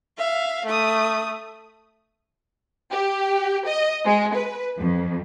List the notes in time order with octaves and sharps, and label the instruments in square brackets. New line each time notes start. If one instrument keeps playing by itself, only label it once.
[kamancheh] E5 F5
A3 D#6
[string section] G4
D#5
G#3
B4
F2